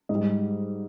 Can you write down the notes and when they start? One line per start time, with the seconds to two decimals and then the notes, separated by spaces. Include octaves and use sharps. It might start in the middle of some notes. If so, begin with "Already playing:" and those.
0.09 G#2 D#5
0.15 G3